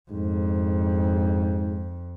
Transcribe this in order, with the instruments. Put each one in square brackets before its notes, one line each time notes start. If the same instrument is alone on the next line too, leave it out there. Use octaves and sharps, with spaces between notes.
[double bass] F2 [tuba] G#2